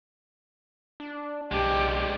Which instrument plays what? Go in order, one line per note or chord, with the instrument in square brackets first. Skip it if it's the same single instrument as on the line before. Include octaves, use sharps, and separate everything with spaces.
[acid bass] D4
[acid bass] B1 [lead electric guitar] G#3 D4 [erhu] G4